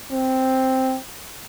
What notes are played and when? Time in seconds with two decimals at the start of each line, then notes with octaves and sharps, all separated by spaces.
0.12 C4